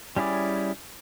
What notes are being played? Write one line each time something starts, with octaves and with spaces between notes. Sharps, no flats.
G3 C#4 E4 G#4 D5